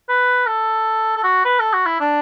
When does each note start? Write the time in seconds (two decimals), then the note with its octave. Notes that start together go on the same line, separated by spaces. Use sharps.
0.09 B4
0.47 A4
1.17 A4
1.24 F#4
1.45 B4
1.59 A4
1.73 F#4
1.86 E4
2.00 D4